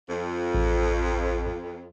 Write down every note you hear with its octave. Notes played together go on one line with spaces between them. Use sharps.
F2
A1